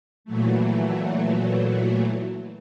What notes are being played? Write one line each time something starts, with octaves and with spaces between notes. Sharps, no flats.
A#2 E3 F#3 A3